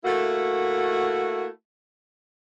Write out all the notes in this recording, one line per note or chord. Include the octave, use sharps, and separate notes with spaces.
A3 A#3 E4 F#4